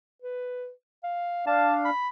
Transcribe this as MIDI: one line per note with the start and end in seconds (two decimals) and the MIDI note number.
0.22 0.71 71
1.04 1.42 77
1.47 1.90 62
1.47 1.90 77
1.47 1.75 81
1.85 2.09 83